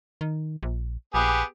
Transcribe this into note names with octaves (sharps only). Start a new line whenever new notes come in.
D#3
A#1
A#1 B3 G4 G#4